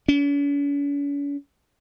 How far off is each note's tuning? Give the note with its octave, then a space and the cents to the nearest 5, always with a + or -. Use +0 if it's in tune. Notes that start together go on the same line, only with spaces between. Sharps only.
C#4 +45